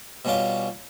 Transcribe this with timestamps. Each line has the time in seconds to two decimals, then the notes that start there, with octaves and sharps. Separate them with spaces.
0.25 B2 G3 C#4 F4 D6